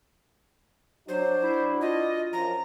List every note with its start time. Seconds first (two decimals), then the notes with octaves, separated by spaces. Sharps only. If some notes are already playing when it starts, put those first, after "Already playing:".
1.09 F#3 D4 F#4 C5
1.43 E4
1.81 F4 D#5
2.33 F#2 F3 A#5